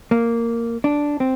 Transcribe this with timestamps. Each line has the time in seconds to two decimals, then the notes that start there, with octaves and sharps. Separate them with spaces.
0.11 A#3
0.84 D4
1.20 C4